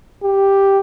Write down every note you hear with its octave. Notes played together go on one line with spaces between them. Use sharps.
G4